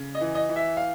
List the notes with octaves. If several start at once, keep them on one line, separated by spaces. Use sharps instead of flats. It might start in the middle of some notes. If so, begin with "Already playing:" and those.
Already playing: C#3
D#5
E3
D#5
E3
E5
F5